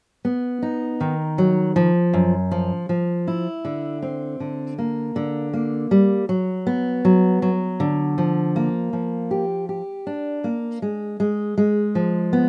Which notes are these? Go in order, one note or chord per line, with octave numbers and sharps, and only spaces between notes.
B3
D#4
D#3
F#3
F3
F#2
F3
F3
E4
D3
C4
D3
A#3
D3
A#3
G3
F#3
B3
F#3
F#3
D3
F3
A#3
F3
G4
G4
D4
A#3
G#3
G#3
G#3
F3
B3